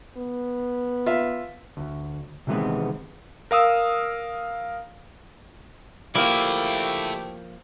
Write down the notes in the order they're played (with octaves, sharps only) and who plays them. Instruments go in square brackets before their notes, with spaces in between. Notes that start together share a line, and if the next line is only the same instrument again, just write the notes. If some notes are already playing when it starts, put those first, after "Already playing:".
[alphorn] B3
[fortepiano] F4 E5
[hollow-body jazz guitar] D2
C3 D#3 E3 G#3 B3 C4
[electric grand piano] A#4 F5 D#6 E6
[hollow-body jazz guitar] F3 A#3 [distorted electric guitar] A3 D5 [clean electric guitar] E4 [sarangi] G4